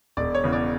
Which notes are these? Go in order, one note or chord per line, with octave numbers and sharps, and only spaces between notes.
E1 D5
C#5
E2 C#3
D5